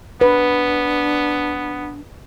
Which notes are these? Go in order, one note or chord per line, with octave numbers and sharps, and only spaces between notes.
B3 D4 B4